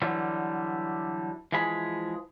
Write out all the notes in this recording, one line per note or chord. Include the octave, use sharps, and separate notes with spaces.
D3 E3 F#3 G3
E3 F3 G#3 G#4 B5